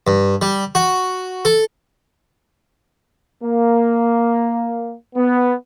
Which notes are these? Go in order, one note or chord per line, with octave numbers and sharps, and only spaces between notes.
G2
G3
F#4
A4
A#3
B3